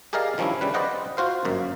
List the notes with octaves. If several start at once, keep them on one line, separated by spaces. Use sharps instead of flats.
G4 G#4 A#4 D5 D#5 F5
D#3 F3 G3 C#4 D4 E4
C#3 G3 B4
B4 C5 D5 D#5 F#5 G5
F4 F#4 C5 F5
G1 F#2 A#3